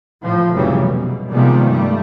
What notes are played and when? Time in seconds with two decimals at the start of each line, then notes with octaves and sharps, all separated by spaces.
0.22 A2 F3
0.53 F1 C#3 E3 F#3 G3 C#4
0.83 G#2 B2
1.30 C3 D#3 F3 G3 G#3 B3
1.67 G2 G3 A3